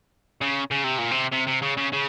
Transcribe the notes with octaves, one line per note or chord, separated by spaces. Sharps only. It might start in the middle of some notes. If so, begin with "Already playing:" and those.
C#3
C#3
C3
A#2
C3
C3
C3
C#3
C#3
C#3